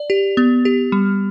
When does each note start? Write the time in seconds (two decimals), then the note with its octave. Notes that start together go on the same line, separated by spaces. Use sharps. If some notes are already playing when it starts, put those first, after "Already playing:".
Already playing: D5
0.10 G4
0.37 B3
0.65 G4
0.92 G3